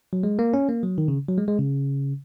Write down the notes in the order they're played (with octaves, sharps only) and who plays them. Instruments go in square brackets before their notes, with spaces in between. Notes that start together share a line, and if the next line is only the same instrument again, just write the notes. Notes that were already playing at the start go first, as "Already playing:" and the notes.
[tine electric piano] F#3
G#3
A#3
C#4
A#3
F#3
D#3
C#3
F#3
G#3
G#3
C#3